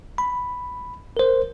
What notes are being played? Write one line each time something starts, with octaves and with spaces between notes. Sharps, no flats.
B5
A#4 C5